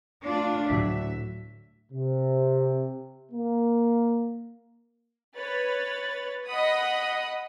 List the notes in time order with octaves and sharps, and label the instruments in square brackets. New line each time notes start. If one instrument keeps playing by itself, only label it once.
[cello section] A3 D4 F4
[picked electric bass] D2 A2 F#3 [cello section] E5
[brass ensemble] C3
A#3
[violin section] B4 C#5 A6
D#5 F#5 B5 D#6